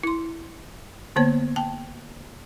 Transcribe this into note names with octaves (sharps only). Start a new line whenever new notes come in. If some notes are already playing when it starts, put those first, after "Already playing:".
E4 C6
D3 A#3 B3 C5 C#5
G5 A5